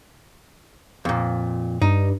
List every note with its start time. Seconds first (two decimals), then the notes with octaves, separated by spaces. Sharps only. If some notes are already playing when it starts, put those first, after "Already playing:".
1.05 F2 A#2
1.82 G2 D#4